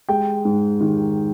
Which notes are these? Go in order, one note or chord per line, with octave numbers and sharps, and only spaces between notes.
G#3 G5
G#2
D#3